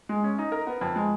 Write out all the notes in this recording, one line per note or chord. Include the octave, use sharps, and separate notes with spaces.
G#3
C#4
D#4
A#4
B3
F2
G#3